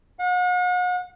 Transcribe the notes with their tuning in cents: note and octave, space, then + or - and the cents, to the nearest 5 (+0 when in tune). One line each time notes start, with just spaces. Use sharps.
F#5 -40